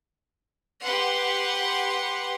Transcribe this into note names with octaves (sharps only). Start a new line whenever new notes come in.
G4 B4 F#5 C6